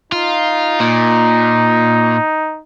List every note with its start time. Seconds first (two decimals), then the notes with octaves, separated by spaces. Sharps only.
0.12 D#4 F4
0.80 A#2